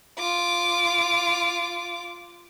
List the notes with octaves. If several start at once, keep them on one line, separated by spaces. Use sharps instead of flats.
F4 D6